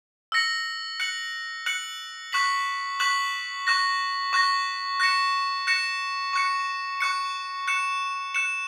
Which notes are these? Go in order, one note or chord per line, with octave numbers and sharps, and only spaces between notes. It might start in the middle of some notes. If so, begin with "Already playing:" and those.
E6 A#6 C#7 F#7
F#6 C#7 F#7
F#6 C#7 F#7
C#6 F#6 B6 F#7
C#6 F#6 B6 F#7
C#6 F#6 A#6
C#6 F#6 A#6
F#6 A#6 C#7 E7
F#6 A#6 C#7 E7
C#6 F#6 C#7
C#6 F#6 C#7
F#6 C#7 E7
F#6 C#7 E7